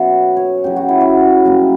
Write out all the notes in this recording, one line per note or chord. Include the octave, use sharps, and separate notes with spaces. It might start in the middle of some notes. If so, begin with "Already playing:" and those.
Already playing: B2 F#3 B3 C#4 E5
C#5
F#2 C#3 F#3 G4
F#4
E4
F#4
F#2 C#3 G3 A#3